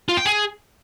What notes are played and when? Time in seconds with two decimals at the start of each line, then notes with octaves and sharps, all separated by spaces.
0.09 F4
0.17 G5
0.26 G#4